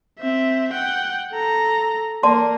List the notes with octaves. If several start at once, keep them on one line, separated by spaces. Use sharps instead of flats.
C4 E5
F#5 G5
A4 A#5
A#3 D5 A5 C6